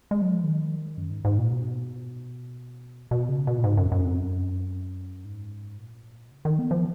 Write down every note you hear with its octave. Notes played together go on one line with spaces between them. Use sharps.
G#3
F#3
F3
D#3
F#2
G#2
G#2
A#2
B2
B2
C#3
B2
A#2
G#2
F#2
F#2
F2
F#2
G#2
A#2
B2
C#3
D#3
B3
F3